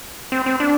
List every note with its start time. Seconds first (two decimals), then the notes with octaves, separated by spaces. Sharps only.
0.32 C4
0.46 C4
0.60 D4